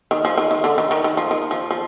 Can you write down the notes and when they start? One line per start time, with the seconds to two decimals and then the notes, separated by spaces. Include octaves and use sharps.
0.11 D#3
0.25 F3
0.38 D#3
0.51 D#3
0.64 D3
0.78 D#3
0.91 D#3
1.04 D#3
1.17 F3
1.31 D#3
1.51 F3
1.71 F3